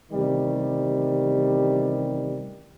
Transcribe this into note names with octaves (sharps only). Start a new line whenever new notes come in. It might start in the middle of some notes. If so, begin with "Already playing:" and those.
A1 C3 D#3 G3